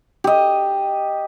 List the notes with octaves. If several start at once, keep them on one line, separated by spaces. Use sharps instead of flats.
G4 D#5